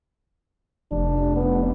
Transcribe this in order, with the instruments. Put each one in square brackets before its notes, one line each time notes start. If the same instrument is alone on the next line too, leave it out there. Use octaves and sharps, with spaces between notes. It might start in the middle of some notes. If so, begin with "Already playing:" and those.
[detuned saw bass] F1 [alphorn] D4
[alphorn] B3